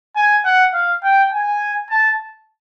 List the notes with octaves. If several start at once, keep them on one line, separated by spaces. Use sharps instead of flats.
G#5
F#5
F5
G5
G#5
A5